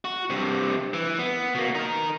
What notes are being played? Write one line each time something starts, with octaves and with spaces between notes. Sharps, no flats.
F#4
G2 C3
E3
B3
B2 A#3
D#4 A#4